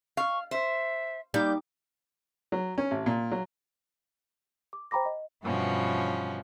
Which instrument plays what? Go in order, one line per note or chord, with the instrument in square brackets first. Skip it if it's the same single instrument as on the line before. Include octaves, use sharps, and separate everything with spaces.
[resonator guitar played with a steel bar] F5 [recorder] C#6
[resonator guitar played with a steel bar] C5 [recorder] E5
[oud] G3 [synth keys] A#3 D#4 D6 [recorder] G6
[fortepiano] F#3
C#4
A1
A#2
F#3
[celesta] D6
C5 G5 A#5 B5 D6 A#6
D#5
[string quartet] G2 B2 E3 F3 C#4 F#4